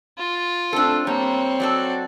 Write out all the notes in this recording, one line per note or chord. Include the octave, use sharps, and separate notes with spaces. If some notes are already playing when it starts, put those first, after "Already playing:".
F4
A3 C4 D4 A4
G3 A#3 C4 C#5
F#3 F#4 A4 D5